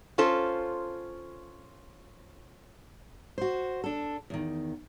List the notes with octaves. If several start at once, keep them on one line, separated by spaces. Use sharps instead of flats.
C#4 F4 A4 C5
F#4 C5
D4 A4
E2 D#3